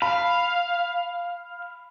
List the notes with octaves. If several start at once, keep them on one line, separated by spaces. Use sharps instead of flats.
F5 B5